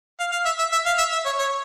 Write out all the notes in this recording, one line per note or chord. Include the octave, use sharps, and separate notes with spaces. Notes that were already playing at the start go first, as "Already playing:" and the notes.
F5
F5
E5
E5
E5
F5
E5
E5
C#5
C#5